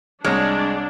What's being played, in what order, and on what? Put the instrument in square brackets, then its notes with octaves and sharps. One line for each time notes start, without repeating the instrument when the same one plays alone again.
[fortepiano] C2 C#5 F6 [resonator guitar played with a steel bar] G#3 [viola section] D4